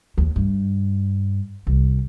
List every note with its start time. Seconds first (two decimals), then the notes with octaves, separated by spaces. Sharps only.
0.18 D#2
0.36 G2
1.67 C2